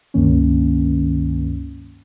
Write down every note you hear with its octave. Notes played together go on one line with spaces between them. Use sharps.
C#2 G2 D#3 A#3 C#4